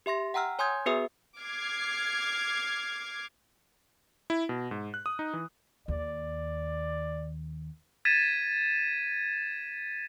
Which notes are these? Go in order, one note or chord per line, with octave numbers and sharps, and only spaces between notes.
G4 E5 C6 A#6
F#5 G5 A#5 E6 F6
C#5 G#5 C6 D#6 G6 G#6
B3 F#4 G#4 B4 E5 D#6
D6 F6 G#6 C7
E4
B2
G#2
F#6
D#6
D#4
E3
D#2 D5
G#6 A6 B6 D#7 E7